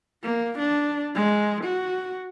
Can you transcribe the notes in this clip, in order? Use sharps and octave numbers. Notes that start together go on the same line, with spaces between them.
A#3
D4
G#3
F#4